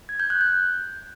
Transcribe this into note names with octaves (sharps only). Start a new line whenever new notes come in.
G#6
G6
F#6
G6